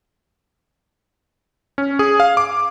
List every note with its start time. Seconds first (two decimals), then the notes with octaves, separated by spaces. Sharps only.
1.78 C#4
1.99 G#4
2.20 F5
2.37 D6